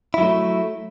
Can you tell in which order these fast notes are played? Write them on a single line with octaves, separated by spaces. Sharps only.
E4 F#3 A3